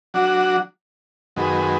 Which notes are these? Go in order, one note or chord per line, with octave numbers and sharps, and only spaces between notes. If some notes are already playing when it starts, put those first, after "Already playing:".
F#3 D4 F#4
F#2 D#3 G#3 B3